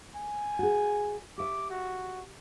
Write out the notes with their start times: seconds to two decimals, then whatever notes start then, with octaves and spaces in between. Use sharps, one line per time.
0.15 G#5
0.59 F#4 G#4
1.38 G4 E5 D6
1.70 F#4